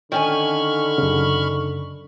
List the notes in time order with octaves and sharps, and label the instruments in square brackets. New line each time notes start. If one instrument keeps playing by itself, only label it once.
[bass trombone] D3 [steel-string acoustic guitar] D#3 C#4 G#5 [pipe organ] B5 C#6 F6
[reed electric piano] F#2 C#3